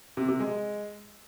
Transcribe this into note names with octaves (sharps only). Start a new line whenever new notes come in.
C3
C3
G#3